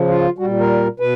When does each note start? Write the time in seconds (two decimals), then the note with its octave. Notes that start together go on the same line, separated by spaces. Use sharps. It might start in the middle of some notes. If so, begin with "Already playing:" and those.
Already playing: C#3 F3
0.08 F4
0.39 G3 F#4
0.43 A#2
0.59 A#4
1.00 B2 B4